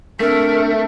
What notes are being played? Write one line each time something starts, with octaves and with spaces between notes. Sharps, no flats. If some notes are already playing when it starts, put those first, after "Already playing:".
A3 C4 D4 A#4